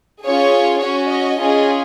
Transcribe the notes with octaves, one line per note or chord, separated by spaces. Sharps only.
C#4 F4 G#4 C#5
C#4 F#4 C#5
D#5
C#4 F4 G#4